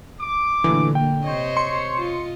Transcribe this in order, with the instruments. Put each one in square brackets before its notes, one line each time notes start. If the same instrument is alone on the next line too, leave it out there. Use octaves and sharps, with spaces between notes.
[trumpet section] D6
[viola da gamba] A#2 F#3 A3 [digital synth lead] D3 [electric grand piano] E3
[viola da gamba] A#3 [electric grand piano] G5
[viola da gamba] C3 D#5 [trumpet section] C5 C#5
[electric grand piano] C6 [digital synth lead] C#7
[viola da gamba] F4 D#5